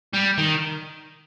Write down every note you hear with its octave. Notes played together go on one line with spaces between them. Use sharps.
G3
D#3